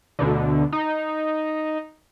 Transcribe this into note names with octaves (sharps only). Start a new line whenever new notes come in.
D2 B2 D3
D#4